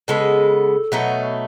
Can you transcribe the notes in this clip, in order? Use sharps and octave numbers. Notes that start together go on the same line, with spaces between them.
C#3 G#3 B3 A4
B2 F#3 A3 D#4